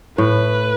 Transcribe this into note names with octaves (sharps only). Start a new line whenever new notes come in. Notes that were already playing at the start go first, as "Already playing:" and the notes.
A2 B4